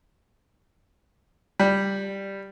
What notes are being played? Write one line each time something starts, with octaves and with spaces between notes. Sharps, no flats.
G3